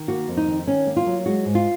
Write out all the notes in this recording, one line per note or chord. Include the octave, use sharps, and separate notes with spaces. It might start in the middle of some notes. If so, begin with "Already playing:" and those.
Already playing: D#3
A#3 F#4
F2
D#4
D#3
D#3 C#4
A#3
F4
F#3
G#3 F#4
G#2
F4